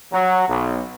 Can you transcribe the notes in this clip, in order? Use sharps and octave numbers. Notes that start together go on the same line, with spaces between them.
F#3
B1